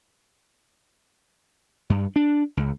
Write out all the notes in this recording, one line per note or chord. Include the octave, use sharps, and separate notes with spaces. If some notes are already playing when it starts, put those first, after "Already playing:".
G2
D4
C#2